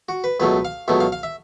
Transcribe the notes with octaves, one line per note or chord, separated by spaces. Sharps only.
F#4
B4
C#2 B2 F#3 A3 B4
F5
C#2 B2 F#3 A3 E5
F5
F5
E5